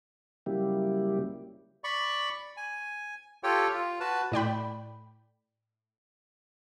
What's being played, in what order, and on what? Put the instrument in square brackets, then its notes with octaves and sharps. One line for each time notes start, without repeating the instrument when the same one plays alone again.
[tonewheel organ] C#3 F#3 G3 A#3 E4 G4
[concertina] D5 B5 C#6
G#5
F4 G4 A4 C#5 G5
F4
F#4 B4 A5
[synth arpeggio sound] A2 D5 G5 B5